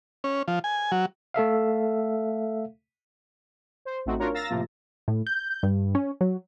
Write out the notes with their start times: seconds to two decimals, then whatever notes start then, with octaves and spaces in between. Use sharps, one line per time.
0.24 C#4
0.48 F3
0.64 G#5
0.92 F#3
1.34 A3 A4 E5 F5
3.85 C5
4.05 A1 A3 C4 D#4 F#4
4.19 D4 F4 F#4 A#4 C#5
4.34 F5 A#5 E6 A6 A#6
4.50 A2 C3 F3 A#3 F4
5.08 A2
5.27 G6
5.63 G2
5.95 C#4
6.21 F#3